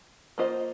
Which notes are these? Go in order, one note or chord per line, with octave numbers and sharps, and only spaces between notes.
A#3 F4 C5 D#5